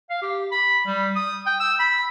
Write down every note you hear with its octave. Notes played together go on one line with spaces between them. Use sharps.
F5
G4
B5
G3
D#6
G5
E6
B5